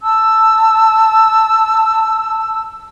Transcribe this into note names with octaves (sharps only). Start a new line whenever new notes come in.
A5 E6